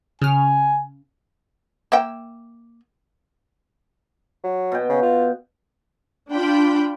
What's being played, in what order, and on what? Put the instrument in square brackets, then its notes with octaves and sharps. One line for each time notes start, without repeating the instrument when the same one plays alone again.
[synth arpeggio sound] C#3 F6 [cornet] G#5
[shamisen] A#3 E5 G5
[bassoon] F#3
[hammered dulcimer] B2 G5
[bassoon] C#3
F4
[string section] D4 F4 G5 B5